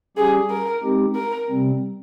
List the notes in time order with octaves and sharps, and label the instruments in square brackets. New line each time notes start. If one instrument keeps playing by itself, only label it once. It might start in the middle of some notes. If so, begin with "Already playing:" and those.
[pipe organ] G3 C#4 G4 [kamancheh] G#4
[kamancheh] A#4
[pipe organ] G#3 C4 D#4 G4
[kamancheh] A#4
[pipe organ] C3 G3 C4